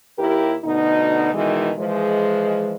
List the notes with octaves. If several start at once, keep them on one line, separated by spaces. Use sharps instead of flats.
D#2 E4 G4 A#4
D2 B2 D3 D#4
B2 D#3 E3 G#3
E3 F3 G#3